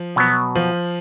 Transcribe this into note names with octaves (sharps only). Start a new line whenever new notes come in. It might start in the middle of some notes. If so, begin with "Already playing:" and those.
Already playing: F3
B2 F#3 B3
F3